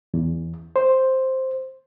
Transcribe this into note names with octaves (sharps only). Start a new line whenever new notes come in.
E2
C5